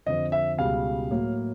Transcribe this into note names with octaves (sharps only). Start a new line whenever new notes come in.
F2 D3 F3 D#5
E5
C#2 B2 G3 F5
A2 F#3 A#3